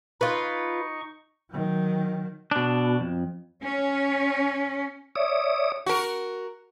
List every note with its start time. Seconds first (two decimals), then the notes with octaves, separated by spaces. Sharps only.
0.21 D#4 F4 B4 C#6
1.50 D#3 F#3
2.51 B2 D4
3.00 F2
3.63 C#4
5.16 C#5 D5 E5 D#6
5.86 F#4 A#4